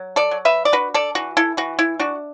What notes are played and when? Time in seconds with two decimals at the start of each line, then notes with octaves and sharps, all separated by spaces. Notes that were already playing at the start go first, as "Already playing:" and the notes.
Already playing: F#3
0.16 A4 D5
0.31 F#3
0.45 B4 E5
0.65 D5
0.73 D4 F#4 B4
0.94 A4 D5
1.15 E3 F#4
1.37 E4 A4
1.57 E3 F#4
1.79 E4
2.00 D4 F#4